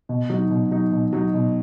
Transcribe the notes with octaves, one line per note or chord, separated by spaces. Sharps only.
B2
F#3 D#4
B2
F#3 D#4
B2
F#3 D#4
B2